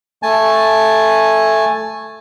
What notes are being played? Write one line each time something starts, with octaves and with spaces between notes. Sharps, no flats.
A3 G#5 A5